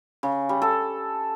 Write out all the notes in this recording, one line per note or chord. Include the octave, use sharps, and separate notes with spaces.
C#3
G3
A4